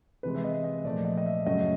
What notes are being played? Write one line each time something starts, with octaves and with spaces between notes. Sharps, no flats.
C3 E3 G#3 B4
E5
D#5
D#5
A#2 F3 A3 D5
D#5
D#5
E5
F#2 C#3 F#3 A3 D#5